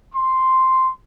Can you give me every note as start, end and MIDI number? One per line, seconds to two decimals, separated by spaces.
0.14 0.87 84